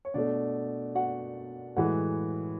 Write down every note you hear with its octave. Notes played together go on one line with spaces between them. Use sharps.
C#5
B2 A3 D4 D5
F#4 F#5
A2 E3 G#3 F#4 F#5